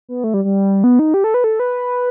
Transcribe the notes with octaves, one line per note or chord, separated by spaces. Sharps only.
B3
A3
G3
G3
B3
D#4
G4
A4
B4
A4
B4